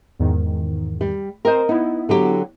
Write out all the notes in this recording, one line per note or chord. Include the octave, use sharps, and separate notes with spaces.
E2 G#2 D#3
G3
C4 A#4 C5 D#5
B3 D#4 E4
D3 F#3 G4